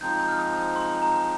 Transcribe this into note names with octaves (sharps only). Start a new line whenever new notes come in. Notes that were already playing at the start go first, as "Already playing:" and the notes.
F3 G#3 C4 D#4 G6
G6
F6
D#6
C6
A#5